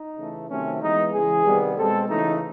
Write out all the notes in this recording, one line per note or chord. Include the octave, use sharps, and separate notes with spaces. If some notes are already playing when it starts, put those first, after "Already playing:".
Already playing: D#4
C#3 E3 A3
C3 D#3 F#3 A3 C4 C#4
E3 G#3 B3 D#4
C#3 E3 G#3 G#4
C3 D#3 G3 B3
B2 G#3 C4 A4
C#3 E3 A3 D#4